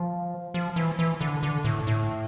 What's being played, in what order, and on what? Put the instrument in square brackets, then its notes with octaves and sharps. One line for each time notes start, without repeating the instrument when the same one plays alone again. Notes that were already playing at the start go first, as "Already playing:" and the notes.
Already playing: [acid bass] F3
F3
E3
E3
D3
D3
A2
A2